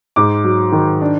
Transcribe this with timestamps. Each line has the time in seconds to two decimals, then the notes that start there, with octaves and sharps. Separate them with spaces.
0.16 G#2 D6
0.44 F#3
0.72 D#3
1.02 D4